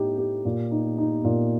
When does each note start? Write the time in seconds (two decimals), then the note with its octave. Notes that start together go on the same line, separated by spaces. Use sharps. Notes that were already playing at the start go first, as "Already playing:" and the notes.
Already playing: A2 D#4 G4
0.18 G4
0.45 A#2
0.71 D#4
0.98 D#4
1.24 A#2